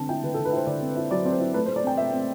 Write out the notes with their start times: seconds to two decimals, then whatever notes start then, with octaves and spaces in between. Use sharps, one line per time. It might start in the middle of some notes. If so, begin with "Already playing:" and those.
Already playing: D3 C4 A5
0.09 E4 G5
0.23 D3 B4
0.34 A4
0.39 D3
0.45 B4
0.52 E4 C5
0.67 D3 D5
0.82 C4
0.96 E4
1.11 F#3 D5
1.25 C4 D5
1.32 C5
1.40 E4
1.54 A3 B4
1.66 C5
1.68 A3
1.76 D5
1.84 C4 G5
1.98 A3 E5
2.13 C4